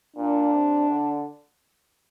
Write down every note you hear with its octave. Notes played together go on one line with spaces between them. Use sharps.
A#2 D4
C3
D3